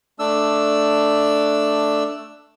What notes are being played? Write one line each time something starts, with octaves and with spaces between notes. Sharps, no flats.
A3 D4 E6